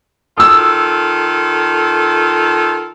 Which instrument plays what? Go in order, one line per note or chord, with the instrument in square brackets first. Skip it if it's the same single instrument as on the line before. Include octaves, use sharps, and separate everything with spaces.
[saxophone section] D#3 F4 A4 [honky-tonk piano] D#6 E6